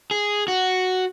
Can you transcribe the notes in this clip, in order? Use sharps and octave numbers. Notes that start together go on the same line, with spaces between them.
G#4
F#4